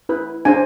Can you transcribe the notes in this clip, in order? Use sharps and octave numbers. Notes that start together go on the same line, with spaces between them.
E4 B4
D4 G#4 C5 G#5